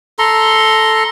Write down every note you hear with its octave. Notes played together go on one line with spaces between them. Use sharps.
A4 A#5 C6